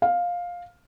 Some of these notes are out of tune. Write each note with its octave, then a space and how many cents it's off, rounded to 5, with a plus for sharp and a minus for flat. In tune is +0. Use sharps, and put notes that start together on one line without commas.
F5 +10